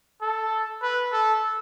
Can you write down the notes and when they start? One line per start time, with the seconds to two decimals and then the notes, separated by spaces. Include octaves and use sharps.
0.22 A4
0.82 B4
1.12 A4